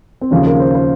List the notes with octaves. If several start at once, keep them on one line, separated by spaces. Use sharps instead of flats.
C4
D#2 C#3 F3 C#4
A#4
C5
C5